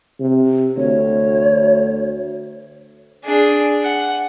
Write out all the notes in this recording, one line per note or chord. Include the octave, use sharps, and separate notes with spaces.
C3
D2 C#5
D4 G#4
F#5